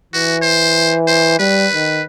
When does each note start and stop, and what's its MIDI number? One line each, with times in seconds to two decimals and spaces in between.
0.14 1.34 52
0.14 0.37 66
0.42 0.96 72
1.07 1.38 72
1.39 1.67 55
1.39 2.03 71
1.73 2.03 51